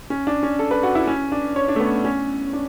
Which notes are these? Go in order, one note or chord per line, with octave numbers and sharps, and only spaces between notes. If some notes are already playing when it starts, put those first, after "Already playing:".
C#4
D4
C#4
A4
B4
F#4
E4
C#4
D4
C#5
D4
A3
B3
C#4
D4